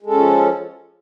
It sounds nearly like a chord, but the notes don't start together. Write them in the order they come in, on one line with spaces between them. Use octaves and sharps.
G#3 A4 C#4 F3